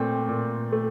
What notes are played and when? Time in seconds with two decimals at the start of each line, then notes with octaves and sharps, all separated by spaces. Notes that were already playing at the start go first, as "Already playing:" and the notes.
Already playing: A#2 A3 C4
0.29 A#2
0.72 A3